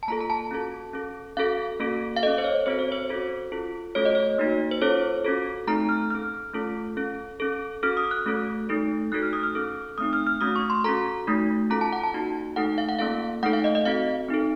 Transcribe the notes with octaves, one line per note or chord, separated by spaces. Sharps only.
A5
A#3 F4 A4 A#5
A#5
A5
C#4 F#4 A4
C#4 A4
C#4 F#4 A4 F5
A#3 C#4 F#4 A4
F5
C#4 A4 D#5
C5
C#5
C4 F#4 A4 C5
C#5
C5
C#4 F#4 A4
C#4 F4 A4
A3 C#4 F#4 A4 C#5
D#5
C#5
A#3 D#4 F#4
C5
C#4 F4 A4 C#5
C#4 F#4 A4
A3 C4 D#4 A4 A#5
F6
C#4 A4 F6
A3 C#4 F4 A4
C#4 A4
C#4 A4
C#4 F#4 A4 F6
D#6
F#6
A3 C#4 F#4 A4
A3 D#4 A4
A3 D#4 F#4 A4 F#6
F6
D#6
F6
C#4 A4
A3 C4 D#4 D#6
F6
F6
A3 C#4 F#4 D#6
C#6
C6
C#4 F#4 A4 A#5
A3 D#4 F#4
C#4 F4 A4 A#5
A5
F#5
A5
A#3 D#4 F#4
A3 D#4 A4 F#5
F5
F#5
A#3 C#4 F4 A4 F5
A3 D#4 A4 F#5
F5
D#5
D#5
C4 F#4 A4 F5
C4 D#4 A4